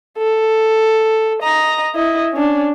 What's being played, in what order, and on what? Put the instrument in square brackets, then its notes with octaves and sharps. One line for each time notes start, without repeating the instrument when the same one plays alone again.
[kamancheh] A4
D#5 A#5
E4 D#5
C#4 D4